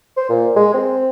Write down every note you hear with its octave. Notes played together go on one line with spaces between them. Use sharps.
C5
A#2
G#3
C4